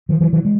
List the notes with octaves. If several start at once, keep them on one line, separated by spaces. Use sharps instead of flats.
D#3 F3
E3 F#3
E3 F#3
G#3